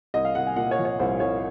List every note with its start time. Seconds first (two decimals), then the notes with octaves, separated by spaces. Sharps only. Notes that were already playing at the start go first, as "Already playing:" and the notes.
0.14 C2 D#5
0.25 F5
0.35 C2 F#5
0.47 G#5
0.56 A#2 F#5
0.71 C#5
0.79 F3
0.85 C#5
0.99 C2 C5
1.20 C2 C#5